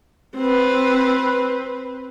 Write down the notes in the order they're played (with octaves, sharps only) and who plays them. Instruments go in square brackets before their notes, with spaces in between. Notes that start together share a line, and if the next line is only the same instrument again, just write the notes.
[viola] C4 B4